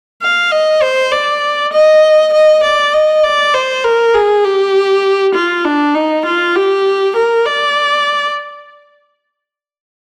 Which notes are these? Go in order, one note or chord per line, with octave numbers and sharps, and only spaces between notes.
F5
D#5
C5
D5
D#5
D#5
D5
D#5
D5
C5
A#4
G#4
G4
F4
D4
D#4
F4
G4
A#4
D5